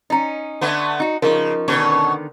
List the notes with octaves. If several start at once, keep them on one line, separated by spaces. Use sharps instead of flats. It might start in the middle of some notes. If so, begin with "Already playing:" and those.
C#4 D#4 D#5 A#5
D3 A3 B3
D#4 F#4
C#3 F3 D#4 A#4
B2 D3 D#3 B3 C#4 C#5